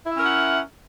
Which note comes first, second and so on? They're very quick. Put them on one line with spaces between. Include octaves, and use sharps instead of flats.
E4 E5 C#4 A#4 F#5